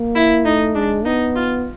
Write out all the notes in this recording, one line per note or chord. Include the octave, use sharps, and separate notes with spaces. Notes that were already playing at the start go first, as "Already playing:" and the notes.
Already playing: A#3
E4
A3 D#4
G#3 D4
B3 D#4
F4